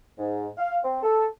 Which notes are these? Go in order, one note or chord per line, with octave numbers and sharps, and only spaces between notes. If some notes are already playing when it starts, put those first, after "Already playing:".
G#2
F5
C4
A4